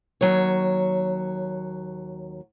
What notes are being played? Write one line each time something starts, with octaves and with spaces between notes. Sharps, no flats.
D#2 F#3 C#5